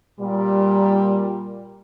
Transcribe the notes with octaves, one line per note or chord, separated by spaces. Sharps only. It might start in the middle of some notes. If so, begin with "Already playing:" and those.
A#2 G3